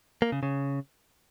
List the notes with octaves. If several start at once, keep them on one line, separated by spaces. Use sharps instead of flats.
A#3
C#3
C#3